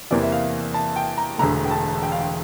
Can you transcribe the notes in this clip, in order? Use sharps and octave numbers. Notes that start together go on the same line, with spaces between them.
E2 C3 E3 A#3 D5
E5
F5
A5
G5
A#5
E1 E2 D3 A3 A#5
G5
A5
G5
F5
G5